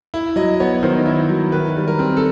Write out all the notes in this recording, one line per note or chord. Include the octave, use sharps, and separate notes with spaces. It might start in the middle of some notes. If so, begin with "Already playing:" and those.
E4
F#3 D#5
B3 C#5
D#3 C5
E4
F#3
D#3 B4
G3
A#4
C4
A4